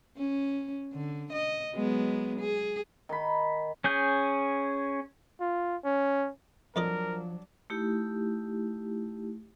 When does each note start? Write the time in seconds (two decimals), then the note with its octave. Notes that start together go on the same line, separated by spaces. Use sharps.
0.17 C#4
0.94 D3
1.33 D#5
1.73 F#3 G#3 B3
2.40 G#4
3.09 D#3 B5
3.84 C#4 G#4 G6
5.40 F4
5.85 C#4
6.76 F2 F3 F#3 D4 A#4 D5 D#5
7.70 A3 D#4 E4 G4